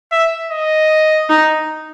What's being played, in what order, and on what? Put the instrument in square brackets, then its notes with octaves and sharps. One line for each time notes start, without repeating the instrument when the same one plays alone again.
[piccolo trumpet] E5
D#5
[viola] D#4